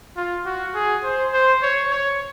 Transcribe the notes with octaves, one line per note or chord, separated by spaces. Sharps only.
F4
F#4
G#4
C5
C5
C#5
C#5